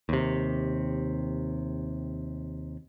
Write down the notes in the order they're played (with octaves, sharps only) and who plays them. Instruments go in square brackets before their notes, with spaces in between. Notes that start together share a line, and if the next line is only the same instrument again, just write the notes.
[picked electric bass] D#2 C3